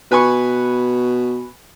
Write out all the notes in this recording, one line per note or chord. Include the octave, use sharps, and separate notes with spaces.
B2 B4 G#5 C#6